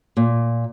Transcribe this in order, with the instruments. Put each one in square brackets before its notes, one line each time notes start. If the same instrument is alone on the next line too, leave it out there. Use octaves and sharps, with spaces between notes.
[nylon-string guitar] A#2